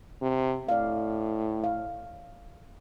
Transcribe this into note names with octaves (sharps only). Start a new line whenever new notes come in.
C3
A2 D5 F5
F5